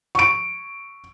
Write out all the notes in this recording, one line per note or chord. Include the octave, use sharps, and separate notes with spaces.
C#6 D7